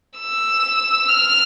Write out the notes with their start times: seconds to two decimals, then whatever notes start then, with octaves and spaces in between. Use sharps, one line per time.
0.19 E6
1.08 F6